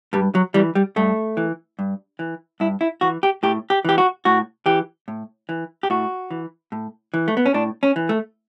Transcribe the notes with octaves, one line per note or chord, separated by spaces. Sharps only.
G2 G3
F#3
E3 G3
G3
G2 A3
E3
G2
E3
G2 E4
E4
E3 F#4
G4
A2 G4
G4
E3 G4
F#4
A2 F#4
E3 G4
A2
E3
G4
A2 F#4
E3
A2
E3
A3
B3
C#4
A2 D4
C#4
E3
A3